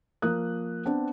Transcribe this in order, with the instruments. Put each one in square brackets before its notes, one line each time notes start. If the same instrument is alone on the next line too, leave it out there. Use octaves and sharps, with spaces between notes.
[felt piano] F3 A#3 A#4 D#6 F#6
B3 C4 D4